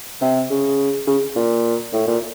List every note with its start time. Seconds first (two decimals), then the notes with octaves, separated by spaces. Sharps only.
0.21 C3
0.50 C#3
1.07 C#3
1.36 A#2
1.93 A2
2.07 A#2